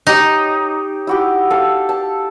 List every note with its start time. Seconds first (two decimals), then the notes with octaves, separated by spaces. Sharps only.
0.07 D#4 G4 C#5
1.07 E4 F#4 G4
1.50 A4 F5
1.89 A5